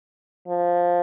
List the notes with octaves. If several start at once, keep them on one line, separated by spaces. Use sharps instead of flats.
F3